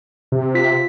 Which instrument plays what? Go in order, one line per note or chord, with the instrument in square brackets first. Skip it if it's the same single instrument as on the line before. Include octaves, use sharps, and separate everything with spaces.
[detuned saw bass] C3
[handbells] F4 B6